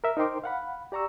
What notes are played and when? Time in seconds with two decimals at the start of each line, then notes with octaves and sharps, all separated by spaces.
0.04 A#4 E5
0.17 D#4 A#4 C5 G5 C6 D6
0.44 F5 F#5 B5
0.92 G4 D5 A#5 C#6 E6